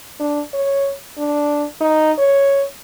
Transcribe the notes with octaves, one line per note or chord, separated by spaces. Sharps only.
D4
C#5
D4
D#4
C#5